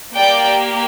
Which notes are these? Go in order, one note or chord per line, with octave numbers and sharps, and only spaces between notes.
A#3 G4 D5 G5